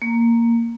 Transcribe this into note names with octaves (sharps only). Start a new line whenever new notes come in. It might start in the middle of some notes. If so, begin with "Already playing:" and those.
A#3